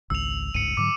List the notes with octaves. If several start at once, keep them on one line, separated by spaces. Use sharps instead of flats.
G#1 C#2 E6 F7
G1 C#2 G#2 C#7 D#7
G#2 D3 F#3 D6